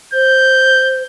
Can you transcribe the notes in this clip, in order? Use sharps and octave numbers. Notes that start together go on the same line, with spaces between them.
C5 G6